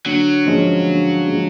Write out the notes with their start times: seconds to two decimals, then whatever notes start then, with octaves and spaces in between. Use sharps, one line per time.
0.06 D3 F#3
0.45 F3 G#3 C#4
0.86 D3
1.26 F3 G#3 C#4